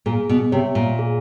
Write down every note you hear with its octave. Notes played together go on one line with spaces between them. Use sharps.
A#2 G#4
B2
C3 C#5 E5
A#2
G#4